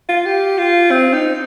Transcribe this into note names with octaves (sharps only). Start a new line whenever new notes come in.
F4
G4
F4
C4
D#4